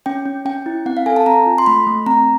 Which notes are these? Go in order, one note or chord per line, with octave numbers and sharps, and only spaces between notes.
C#4 G5
C#4
C#4 G5
E4
C4 F#5
F5
A4 G#5
A5
C4 A#5
F4
C6
A3 B5
A3
C4 A#5